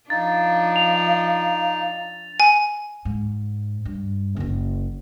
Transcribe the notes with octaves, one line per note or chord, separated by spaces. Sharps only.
F3 D4 D#4 F5 A6
F7
G#5
G#2
G2
F#1 E4